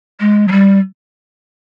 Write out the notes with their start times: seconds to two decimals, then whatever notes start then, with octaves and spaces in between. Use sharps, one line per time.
0.20 G#3
0.48 F#3
0.52 G3